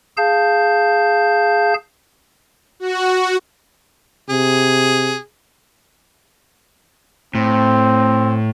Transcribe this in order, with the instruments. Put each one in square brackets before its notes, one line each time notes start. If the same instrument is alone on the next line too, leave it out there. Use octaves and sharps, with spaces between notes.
[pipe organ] G#4 F5 A5 G6
[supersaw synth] F#4
[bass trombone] C3 [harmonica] G#4
[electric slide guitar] A2 [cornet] C4